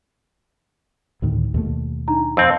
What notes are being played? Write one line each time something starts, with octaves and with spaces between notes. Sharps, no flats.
D2 A2 D#3
D#2 B2 A3
D4 D#4 A#5
F2 C4 E6